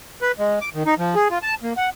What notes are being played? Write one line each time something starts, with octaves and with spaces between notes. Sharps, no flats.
B4
G#3
D6
D#3
D#4
F3
G#4
F4
A5
A#3
F#5